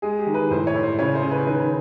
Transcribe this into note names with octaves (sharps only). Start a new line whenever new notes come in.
G#3 G#4
G4
D#3
B4
A2 C5
C#5
A2
C5
C#3 C#5
C5
C#3
B4
D#3 B4